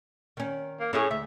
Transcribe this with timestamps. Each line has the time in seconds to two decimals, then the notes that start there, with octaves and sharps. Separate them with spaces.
0.37 D#3 C#4
0.80 A#3
0.93 A2 C#4 E4 G#4
1.11 D2 E5